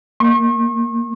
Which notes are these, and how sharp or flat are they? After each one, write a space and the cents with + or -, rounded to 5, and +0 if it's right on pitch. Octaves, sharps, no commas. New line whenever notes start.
A#3 +0 C#6 -40